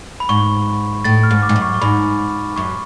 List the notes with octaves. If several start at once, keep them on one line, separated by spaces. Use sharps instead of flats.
B5
G#2 C#6
A2 A6
F6
G#2
D6
G#2
F#2
C#6
C#6
G#2 B5
F#2 C#6